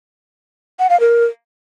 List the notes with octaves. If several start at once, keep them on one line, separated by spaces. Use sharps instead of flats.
F#5
F5
A#4